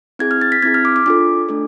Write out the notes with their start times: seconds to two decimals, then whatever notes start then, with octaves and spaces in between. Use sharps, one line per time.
0.19 C4 E4 G#4 G#6
0.31 F6
0.41 A6
0.52 B6
0.62 C4 E4 G#4 G#6
0.74 F6
0.85 D6
0.96 D6
1.06 D4 F4 A4 D6
1.49 A3 D4 A4